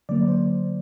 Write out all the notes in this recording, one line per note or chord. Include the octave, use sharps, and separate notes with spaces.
D3 F#3 A#3 D5
C5